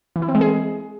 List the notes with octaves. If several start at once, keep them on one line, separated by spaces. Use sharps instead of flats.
E3
E4
C4
G#3
G#4